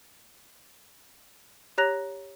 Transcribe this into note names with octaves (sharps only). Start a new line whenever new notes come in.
G4 C#5 A#5 F#6 A#6 F7